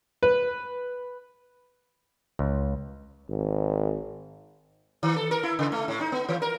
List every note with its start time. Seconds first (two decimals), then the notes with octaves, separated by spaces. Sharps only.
0.23 B4
2.39 C#2
3.29 G#1
5.03 D#3
5.16 A4
5.31 A#4
5.43 E4
5.59 C#3
5.72 A3
5.88 A2
6.01 D#4
6.12 B3
6.29 E3
6.42 A#4